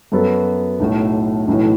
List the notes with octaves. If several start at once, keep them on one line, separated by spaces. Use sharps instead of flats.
F#2 F#3 B3 F#4 A4
B1 A2 A3
B1 A2 E3